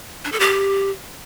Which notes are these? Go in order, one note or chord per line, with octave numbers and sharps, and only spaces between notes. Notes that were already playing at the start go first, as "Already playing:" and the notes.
D4
A4
G4